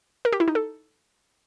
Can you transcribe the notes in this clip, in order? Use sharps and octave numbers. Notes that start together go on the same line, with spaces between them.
A#4
G4
E4
D#4
A4